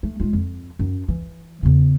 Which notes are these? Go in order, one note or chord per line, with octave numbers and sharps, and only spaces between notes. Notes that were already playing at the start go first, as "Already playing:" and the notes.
A3
G#3 F4
F2
F#2
E3
E2 C#3